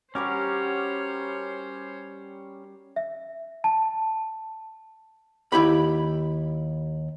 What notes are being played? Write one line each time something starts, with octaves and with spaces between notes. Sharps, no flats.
G3 C#4 F#4 G4 A#4 C5 C#5
E5
A5
D#2 E4 G4 B5